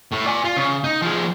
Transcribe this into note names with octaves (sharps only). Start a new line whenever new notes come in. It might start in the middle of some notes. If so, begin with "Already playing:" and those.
A2
D5 G#5
F4
C#3
D#4
F3 G#4